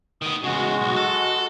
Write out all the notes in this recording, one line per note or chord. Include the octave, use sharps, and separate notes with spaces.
D#3 B3 D#6
E2 C#3 G#3 F#4
B1
A4